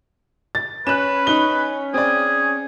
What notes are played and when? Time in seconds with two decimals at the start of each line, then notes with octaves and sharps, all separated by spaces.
0.55 A6
0.87 C#4 B4 F#6 E7
1.27 D#4 F#6 G7
1.94 C4 G#4 D5